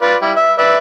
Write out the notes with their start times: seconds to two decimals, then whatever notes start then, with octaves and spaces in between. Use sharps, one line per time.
0.02 F4 B4 D5
0.22 G3 E4
0.37 E5
0.58 B4 D5 E5